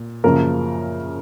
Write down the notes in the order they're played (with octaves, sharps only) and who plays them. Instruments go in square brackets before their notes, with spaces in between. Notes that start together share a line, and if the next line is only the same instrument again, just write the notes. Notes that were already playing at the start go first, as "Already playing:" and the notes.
Already playing: [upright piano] A#2
F#2 C#3 F3 A#3 A#4